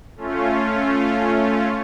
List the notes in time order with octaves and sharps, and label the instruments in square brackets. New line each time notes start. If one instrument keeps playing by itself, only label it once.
[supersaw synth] A3 C#4 F4